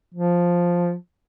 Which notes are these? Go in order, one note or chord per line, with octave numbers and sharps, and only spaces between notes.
F3